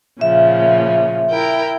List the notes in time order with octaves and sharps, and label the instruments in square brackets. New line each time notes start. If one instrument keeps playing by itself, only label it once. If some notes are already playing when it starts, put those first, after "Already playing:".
[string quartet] A#2 C#3 F3 [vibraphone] E5
[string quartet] E4 A#4 G5